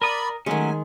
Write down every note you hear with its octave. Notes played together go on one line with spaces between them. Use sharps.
A#4 D5 B5 D#6
D#3 F#3 G#3 A3 C#4 G#5